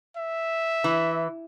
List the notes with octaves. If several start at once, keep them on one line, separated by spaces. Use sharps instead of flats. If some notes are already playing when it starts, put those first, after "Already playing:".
E5
E3